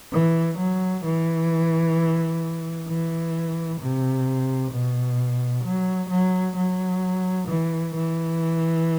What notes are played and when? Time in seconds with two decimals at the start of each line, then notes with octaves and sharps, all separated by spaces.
0.12 E3
0.58 F#3
1.05 E3
2.88 E3
3.81 C3
4.72 B2
5.65 F#3
6.10 F#3
6.57 F#3
7.48 E3
7.95 E3